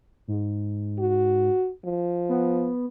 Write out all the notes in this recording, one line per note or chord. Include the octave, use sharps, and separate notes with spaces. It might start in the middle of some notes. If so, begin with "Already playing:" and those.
G#2
F#4
F3
B3